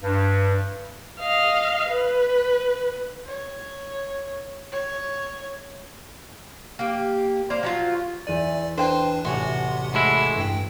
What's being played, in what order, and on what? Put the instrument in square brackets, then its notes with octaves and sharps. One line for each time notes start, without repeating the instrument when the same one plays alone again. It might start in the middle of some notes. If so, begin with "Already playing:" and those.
[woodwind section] G2
[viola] D#5 F5
B4
[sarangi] C#5
C#5
[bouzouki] A#3 G4
A#3 C5 D5 F5
F3 F#3 F4
[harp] E2 D#7 [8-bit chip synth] D5
[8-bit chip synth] D4 B4 [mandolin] C5 G5
[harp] A1 G#5 [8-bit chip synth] C3 F#5 C6 [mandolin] F#4 C#5
[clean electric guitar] A2 G#3 E4
[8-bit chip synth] G2 G5